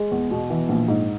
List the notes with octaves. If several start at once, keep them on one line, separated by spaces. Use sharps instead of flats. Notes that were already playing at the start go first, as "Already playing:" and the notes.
Already playing: G#3
E2
B2
E3
A#1
G#2